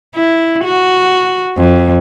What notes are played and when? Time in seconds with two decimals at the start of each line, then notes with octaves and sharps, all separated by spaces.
0.16 E4
0.64 F#4
1.57 F2